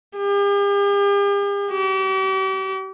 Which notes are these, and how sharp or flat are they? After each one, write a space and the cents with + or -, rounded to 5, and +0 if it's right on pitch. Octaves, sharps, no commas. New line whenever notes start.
G4 +45
G4 -40